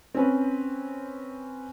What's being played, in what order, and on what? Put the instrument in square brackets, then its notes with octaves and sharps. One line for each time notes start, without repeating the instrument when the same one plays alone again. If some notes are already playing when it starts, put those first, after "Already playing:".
[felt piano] C4 C#4 B4